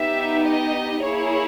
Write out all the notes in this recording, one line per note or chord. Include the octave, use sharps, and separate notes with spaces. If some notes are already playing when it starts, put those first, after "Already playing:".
Already playing: B3 D#4 G4 E5
D#5
A#3 E4 G#4 C#5